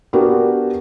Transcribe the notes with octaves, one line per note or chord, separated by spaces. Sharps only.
B3 D4 F#4 G4 A#4 B4